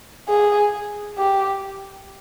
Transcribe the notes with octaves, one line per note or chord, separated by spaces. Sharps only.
G#4
G4